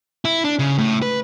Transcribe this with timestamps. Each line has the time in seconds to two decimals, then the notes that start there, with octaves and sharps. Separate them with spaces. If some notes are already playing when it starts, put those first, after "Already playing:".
0.25 E4
0.44 D4
0.59 C#3
0.79 A2
1.02 B4